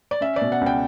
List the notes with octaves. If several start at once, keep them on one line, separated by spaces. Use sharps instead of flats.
D5
C#4 E5
D5
B2
F#5
C#2
G5